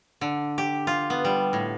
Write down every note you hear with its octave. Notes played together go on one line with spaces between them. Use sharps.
D3
G4
F4
B3
G3
A2